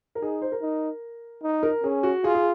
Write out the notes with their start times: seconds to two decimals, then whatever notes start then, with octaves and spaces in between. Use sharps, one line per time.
0.15 A#4
0.22 D#4 G#4
0.42 C5
0.52 A#4
0.62 D#4
1.43 D#4
1.63 A#4
1.84 C#4 G#4
2.03 F#4
2.24 F4 G#4
2.35 G#4